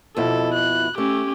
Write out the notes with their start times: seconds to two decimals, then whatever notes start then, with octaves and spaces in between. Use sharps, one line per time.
0.17 F2 B2 E4 A4
0.54 F#6
0.98 A3 C#4 G4